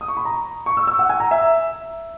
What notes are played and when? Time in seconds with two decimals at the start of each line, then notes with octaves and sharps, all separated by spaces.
0.01 D#6
0.08 C#6
0.17 B5
0.25 A#5
0.66 C#6
0.77 E6
0.87 E6
0.99 F#5
1.10 G#5
1.20 A#5
1.31 E5